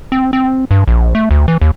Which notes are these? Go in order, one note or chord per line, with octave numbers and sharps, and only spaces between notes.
C4
C4
G2
A#1
A3
D2
E3
D#2